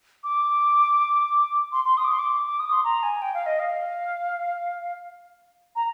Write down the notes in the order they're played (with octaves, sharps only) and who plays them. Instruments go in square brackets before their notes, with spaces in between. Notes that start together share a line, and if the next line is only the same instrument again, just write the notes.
[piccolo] D6
C6
C6
D#6
D6
C6
D6
D6
D#6
C6
A#5
G#5
G5
F5
D#5
F5
A#5